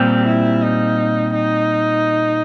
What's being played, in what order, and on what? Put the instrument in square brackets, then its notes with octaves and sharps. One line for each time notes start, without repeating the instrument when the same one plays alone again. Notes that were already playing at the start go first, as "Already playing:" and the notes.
Already playing: [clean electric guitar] A#2 G3 C4 [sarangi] G4
[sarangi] E4
D#4
D#4